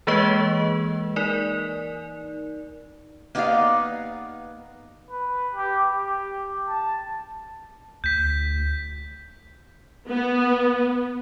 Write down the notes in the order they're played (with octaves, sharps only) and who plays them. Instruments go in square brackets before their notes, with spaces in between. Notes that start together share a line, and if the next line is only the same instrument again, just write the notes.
[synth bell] E3 G#3 A#3 G#4 B4 D#5
D#4 A#4 D5
[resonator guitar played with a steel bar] A#3 B3 D#4 G4 D5 F5
[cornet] B4
G4
G4
A5
[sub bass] D2 [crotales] G6 B6
[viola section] B3